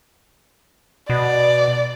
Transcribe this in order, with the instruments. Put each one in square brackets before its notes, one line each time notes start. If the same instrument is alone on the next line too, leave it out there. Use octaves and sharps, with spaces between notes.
[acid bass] B2 [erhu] D5